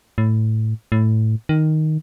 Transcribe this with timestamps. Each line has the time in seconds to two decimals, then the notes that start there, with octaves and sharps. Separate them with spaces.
0.18 A2
0.92 A2
1.49 D#3